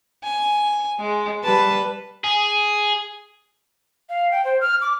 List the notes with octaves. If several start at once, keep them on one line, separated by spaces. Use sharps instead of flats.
G#5
G#3
G3 B4 A5
G#4
F5
G5
C5
F6
D6